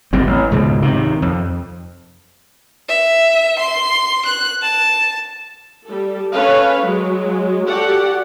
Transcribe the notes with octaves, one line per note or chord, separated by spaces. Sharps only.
G1 G#2 G3 C4
A1
C#2 G#2 B2
C3 D#3
F2
E5
C6
F#6
A5
G3 A4
C#4 A4 B4 C#5 F5
F#3 G#3
F#4 G4 A4 D5 F#5